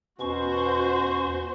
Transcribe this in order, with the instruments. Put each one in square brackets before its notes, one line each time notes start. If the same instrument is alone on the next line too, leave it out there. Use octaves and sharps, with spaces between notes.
[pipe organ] E2 C#4 C#6 [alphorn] B2 [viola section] F#4 C5